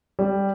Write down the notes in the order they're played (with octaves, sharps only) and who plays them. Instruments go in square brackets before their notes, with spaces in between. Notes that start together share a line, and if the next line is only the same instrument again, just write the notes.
[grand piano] G3